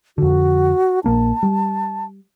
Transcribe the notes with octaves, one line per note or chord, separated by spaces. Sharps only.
F2 D3 F#4
A#1 A#3 D4 A5
G3